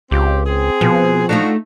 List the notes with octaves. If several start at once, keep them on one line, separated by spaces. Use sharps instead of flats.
C#2 C4 F4 G4
C4 G#4
B2 F3
A3 D4 D#4 F4 F#4 A4